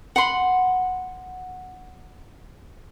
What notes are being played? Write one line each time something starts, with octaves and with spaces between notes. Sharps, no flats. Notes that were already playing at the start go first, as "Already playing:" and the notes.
F#5 B5 C6